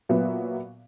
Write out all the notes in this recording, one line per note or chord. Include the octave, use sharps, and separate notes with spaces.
A#2 F#3 B3 E5